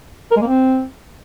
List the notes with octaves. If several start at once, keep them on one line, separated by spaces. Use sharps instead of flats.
A#4
G#3
A#3
C4